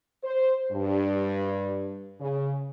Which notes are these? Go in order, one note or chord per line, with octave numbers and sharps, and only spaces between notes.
C5
G2
C#3